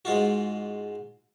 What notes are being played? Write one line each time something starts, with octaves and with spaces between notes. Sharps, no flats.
G#2 G#3 F4 F#4